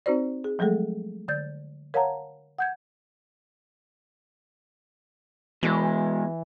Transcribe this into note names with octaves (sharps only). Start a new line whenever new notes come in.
C4 D#4 F#4 C5 D5
G#4
F3 F#3 G#3 A3 G#4 A4
D3 D5 G6 A6
A#4 C#5 F5 F#5 A5 A#5
F#5 G6 G#6
B2 E3 G#3